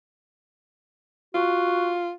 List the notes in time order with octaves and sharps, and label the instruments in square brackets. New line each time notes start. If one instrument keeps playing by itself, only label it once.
[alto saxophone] F4 [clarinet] F#4